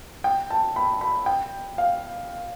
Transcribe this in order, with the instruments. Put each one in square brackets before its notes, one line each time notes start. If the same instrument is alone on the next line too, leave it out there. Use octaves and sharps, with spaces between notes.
[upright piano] G5
A5
B5
B5
G5
F5